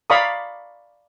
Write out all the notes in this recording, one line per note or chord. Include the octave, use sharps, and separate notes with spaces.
D5 F5 A#5 B5 C#6 D#6